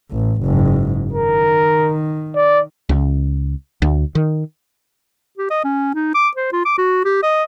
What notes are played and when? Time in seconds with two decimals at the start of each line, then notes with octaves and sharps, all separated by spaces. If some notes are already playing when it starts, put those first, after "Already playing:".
0.12 A1
0.42 F#1 G#2
1.13 D#3 A#4
2.35 D5
2.89 C#2
3.82 D2
4.15 D#3
5.38 G4
5.51 D#5
5.64 C#4
5.95 D#4
6.15 D6
6.37 C5
6.52 F4
6.65 D6
6.78 F#4
7.05 G4
7.23 D#5